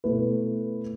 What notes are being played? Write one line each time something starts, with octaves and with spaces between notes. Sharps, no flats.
B2 A3 E4 B4